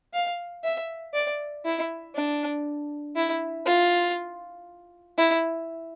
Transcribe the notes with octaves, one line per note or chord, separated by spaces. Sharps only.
F5
E5
D5
E4
D4
E4
F4
E4